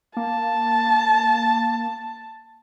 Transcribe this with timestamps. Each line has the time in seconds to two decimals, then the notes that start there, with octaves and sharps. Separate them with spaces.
0.17 A#3 A5